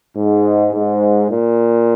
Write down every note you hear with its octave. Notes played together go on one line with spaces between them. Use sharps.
G#2
G#2
A#2